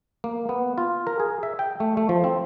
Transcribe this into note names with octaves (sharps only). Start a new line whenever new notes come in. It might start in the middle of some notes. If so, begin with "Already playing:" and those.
A#3
B3
F4
A#4
G#4
E5
G5
A3
A3
F3
C4